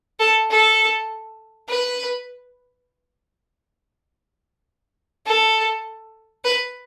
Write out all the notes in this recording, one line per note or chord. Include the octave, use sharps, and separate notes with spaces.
A4
A4
B4
A4
B4